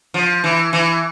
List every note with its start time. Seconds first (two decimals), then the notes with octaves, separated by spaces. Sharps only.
0.14 F3
0.44 E3
0.73 E3